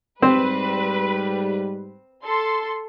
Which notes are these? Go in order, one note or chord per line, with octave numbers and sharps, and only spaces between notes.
G#2 G3 C4 B4
A4 C6